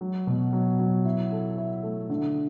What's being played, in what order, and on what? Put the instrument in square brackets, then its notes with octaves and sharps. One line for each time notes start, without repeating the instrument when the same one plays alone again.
[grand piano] F#3
B2
F#3
F#3
E4
A4
E5
A3
D3